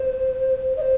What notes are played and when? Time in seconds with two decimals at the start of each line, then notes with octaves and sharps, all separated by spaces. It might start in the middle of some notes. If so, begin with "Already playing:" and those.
Already playing: C5
0.77 D#5
0.81 C5